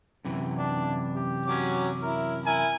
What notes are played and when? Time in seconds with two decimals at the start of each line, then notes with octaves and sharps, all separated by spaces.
0.25 F#2 C3 E3
0.58 D4
1.16 G4
1.46 F#3 C#4 D6
2.02 E4 A#4
2.46 E4 A#4 G#5